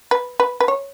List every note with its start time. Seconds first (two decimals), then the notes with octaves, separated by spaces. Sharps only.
0.11 B4
0.40 B4
0.60 B4
0.68 C#5